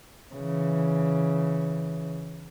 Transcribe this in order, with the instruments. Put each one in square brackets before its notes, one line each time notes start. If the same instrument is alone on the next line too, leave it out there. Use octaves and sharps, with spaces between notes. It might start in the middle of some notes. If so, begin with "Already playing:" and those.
[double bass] C#3 E3